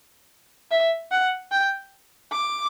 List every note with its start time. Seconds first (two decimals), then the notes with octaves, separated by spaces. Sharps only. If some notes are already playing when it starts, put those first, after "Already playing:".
0.71 E5
1.11 F#5
1.51 G5
2.32 D6